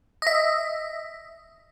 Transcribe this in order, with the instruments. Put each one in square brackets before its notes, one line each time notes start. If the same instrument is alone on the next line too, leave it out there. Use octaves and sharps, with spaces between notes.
[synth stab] D#5 E5